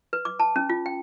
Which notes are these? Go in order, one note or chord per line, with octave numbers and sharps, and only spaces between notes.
B4
D6
A5
C#4
F4
G5